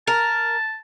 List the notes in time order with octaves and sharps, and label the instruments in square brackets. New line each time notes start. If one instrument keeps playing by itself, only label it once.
[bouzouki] A#4 [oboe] A5